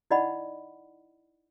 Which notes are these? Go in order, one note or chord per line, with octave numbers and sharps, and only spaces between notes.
D#4 E4 D5 D#5 F#5 B5